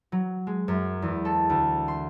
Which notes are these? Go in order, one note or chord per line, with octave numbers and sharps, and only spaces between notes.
F#3
G#3
F#2
E2
A4
D2
C6